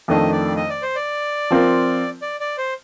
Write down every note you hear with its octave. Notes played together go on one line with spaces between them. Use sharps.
F2 D#3 A3 D4 D#5
D5
D#5
D5
C5
D5
F3 C4 F4 A#4
D5
D5
C5